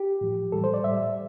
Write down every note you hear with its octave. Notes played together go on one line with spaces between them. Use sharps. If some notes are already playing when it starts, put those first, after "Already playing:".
Already playing: G4
A2 F3
A2 E3 G3 A4
C5
D5
A2 G3 E5